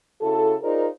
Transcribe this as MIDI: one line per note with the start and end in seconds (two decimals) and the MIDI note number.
0.22 0.55 49
0.22 0.55 64
0.22 0.55 66
0.22 0.55 69
0.62 0.87 63
0.62 0.87 65
0.62 0.87 68
0.62 0.87 70
0.62 0.87 72
0.62 0.87 74